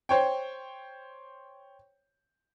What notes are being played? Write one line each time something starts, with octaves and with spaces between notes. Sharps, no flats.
C5 C#5 G5